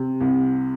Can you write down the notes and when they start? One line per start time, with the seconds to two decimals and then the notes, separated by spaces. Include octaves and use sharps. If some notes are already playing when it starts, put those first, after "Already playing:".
Already playing: C3
0.20 C2